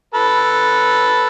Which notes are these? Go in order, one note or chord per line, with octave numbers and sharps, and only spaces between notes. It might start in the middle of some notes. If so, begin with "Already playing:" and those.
A4 B4